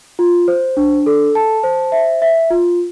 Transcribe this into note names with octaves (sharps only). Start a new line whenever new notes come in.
F4
C5
D4
A4
A5
C5
E5
E5
F4